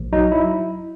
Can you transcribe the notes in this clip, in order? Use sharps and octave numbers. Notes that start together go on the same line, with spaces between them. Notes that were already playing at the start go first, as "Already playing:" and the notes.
Already playing: A#1
F#3 D#4
E4